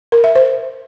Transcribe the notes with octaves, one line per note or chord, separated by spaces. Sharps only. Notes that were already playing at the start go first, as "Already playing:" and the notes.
A#4
E5
C5